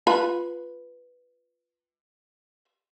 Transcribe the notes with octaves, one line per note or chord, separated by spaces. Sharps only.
F4 B4 B5